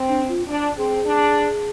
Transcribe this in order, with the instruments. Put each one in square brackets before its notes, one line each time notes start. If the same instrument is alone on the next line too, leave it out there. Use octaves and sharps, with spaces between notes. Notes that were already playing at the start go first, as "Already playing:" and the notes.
Already playing: [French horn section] C4
[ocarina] D4
F4
[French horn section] D4
[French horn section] C4 [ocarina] G#4
[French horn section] D4